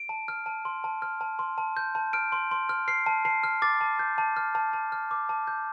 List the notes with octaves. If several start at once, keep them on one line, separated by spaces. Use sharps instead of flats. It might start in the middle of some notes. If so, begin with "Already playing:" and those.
Already playing: D7
A5
F6
A5
C6
A5
F6
A5
C6
A5
G6
A5
F6 D7
C6
C6
F6
F6 C7
A5
A5 C7
F6
D6 A6
A5
G6
A5
F6
A5
A5
F6
D6
A5
G6